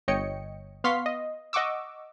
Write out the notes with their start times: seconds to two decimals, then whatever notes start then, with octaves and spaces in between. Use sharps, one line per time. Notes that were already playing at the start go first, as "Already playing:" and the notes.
0.08 G1 C#5 D#5 G5 C#7
0.84 B3 F5 C6 C#6 B6 C7
1.06 D#5
1.53 D#5 F#5 C#6 D6 E6